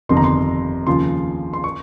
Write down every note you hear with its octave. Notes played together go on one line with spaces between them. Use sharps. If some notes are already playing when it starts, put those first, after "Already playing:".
G1 F2 C3 D#3 C6
A#5
C6
D#2 C#3 F3 C6
C6
C#6